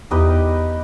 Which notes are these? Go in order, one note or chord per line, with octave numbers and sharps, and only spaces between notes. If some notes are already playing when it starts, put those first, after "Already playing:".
E2 D#4 G4 B4 D#5